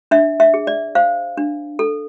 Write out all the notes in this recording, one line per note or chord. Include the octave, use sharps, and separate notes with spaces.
D4 E5
E5
G#4
D5
C5 F5
D4
A4